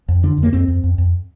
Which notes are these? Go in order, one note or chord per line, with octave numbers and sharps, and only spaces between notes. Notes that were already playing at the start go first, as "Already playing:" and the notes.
F2
D3 D4
F2
A#3
F2 C4
F2
F2
F2